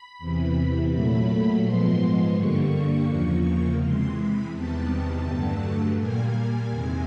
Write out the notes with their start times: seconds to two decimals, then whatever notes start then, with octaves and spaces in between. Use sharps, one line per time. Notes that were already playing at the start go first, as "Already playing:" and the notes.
Already playing: B5
0.19 E2 C3 E3
0.90 A#2 F#3 A3 B5
1.63 G#2 F3 G#3 B3 C6
2.35 G2 D3 G3 A#3 C#6
3.08 E2 C#3 F3 A#3
3.80 C3 E3 G#3 C6
4.16 B5
4.53 E2 C3 D#3 G3 B3 A5
5.25 G2 D3 F#3 A3
5.97 A#2 G3 A#3 G#5
6.69 E2 C3 D#3 G#3